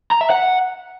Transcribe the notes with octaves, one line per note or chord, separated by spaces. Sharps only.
A#5
E5
F#5